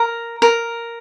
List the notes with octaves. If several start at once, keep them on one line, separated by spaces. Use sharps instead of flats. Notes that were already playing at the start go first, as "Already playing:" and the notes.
Already playing: A#4
A#4